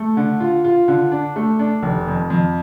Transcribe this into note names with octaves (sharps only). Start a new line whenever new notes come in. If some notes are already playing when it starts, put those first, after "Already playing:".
Already playing: A3
D3
F4
F4
D3
D4
A3
D4
F1
F2
F2